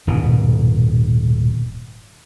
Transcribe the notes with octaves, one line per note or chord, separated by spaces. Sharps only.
D#1 G#2 B2